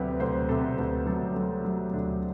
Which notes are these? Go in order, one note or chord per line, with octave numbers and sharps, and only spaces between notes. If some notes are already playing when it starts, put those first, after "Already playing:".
Already playing: D2 C3 F#3 G4 B4
D2 C5
C3 A4
D2 B4
F#3 A4
F#3
F#3
D2 D4